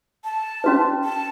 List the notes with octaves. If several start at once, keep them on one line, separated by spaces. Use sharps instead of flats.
A5
C#4 F#4 B4
A5